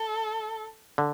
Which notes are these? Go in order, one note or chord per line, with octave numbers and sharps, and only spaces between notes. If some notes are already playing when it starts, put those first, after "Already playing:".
Already playing: A4
D3